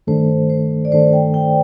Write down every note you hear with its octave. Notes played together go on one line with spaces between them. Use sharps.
G2 D#3 A3 D4 A4 C5
C5
D5
G2 D#3 A3 D4 A4 C5
G5
G5